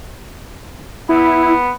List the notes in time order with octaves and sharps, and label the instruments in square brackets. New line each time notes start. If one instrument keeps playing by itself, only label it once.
[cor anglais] B3 [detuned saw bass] E4